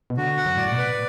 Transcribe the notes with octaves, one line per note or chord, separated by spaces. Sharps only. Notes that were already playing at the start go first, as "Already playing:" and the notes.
B2
D3 F#4
F#5
F#2
A2 D5
B2
B4
A2